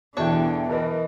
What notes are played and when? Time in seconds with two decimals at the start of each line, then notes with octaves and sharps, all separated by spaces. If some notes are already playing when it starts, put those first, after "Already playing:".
0.17 E2 B2 D3 E3 D4 F#4 C#5 G5
0.69 E3 A#4 B4 D#5